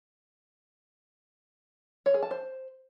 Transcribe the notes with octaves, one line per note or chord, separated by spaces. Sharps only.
C#5
G#4
A5
C5